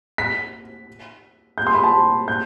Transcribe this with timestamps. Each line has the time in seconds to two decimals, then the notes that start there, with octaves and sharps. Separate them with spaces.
0.18 B6
1.58 G6
1.67 C6
1.75 B5
1.84 A5
2.28 G6